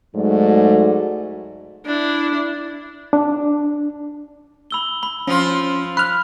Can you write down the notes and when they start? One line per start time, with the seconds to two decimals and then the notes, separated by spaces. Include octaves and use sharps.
0.16 G#2 F#3 A3 F#4 D5
1.86 D4 E4
3.13 D4
4.71 B5 E6 G7
5.03 B5
5.27 F3 C#4 F4
5.97 B5 F6 F#6